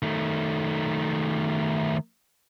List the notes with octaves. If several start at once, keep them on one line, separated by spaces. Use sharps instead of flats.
D#3 A3